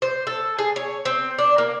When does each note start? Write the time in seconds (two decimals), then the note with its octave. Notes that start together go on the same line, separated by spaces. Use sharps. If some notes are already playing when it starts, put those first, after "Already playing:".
0.02 C5
0.27 A4
0.59 G#4
0.76 C#5
1.05 C4
1.38 D4
1.58 A#3